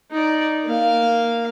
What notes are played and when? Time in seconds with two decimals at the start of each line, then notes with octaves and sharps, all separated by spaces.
0.11 D#4 D5
0.64 A#3 F5